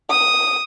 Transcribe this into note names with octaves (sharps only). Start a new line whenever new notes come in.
D#6